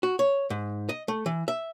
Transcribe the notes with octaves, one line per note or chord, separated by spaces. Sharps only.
F#4
C#5
G#2
D#5
A3
E3
E5